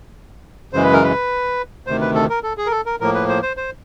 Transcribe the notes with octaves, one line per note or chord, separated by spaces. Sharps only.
F#2 C#3 E3 G#3 C5
B4
A#4
B4
D2 C3 D#3 C5
B4
A4
A#4
A4
G#4
A#4
A4
A#4
A2 F3 A#3 A#4
B4
C5
C5
C5